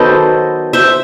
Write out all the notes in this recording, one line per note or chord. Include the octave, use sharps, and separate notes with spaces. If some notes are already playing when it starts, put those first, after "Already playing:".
Already playing: D#3 F#3 B3 A4 C5 D#5
C5 E5